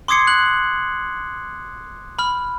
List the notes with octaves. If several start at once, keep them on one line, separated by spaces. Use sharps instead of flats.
C6 D6 D#6 G#6 C7 C#7
F#6 F#7
B5 F6